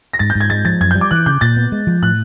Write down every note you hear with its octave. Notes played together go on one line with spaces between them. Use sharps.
A#6
G#2 A6
G6
G#2
G#6
G#3 A6
F3 A6
F#2 G#6
G6
G3
D6
E3 F#6
C#3 G6
A#2 A6
B3
G#3
F3
A2 F#6